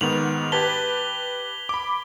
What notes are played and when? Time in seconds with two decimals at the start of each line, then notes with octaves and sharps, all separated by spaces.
0.01 G#2 D#3 B3 F7 F#7
0.52 G4 B4 A5 G#6 B6 G7
1.69 B5 D6